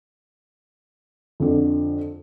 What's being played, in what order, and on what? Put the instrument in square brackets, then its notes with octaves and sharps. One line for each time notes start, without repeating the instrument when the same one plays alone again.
[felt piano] F2 D3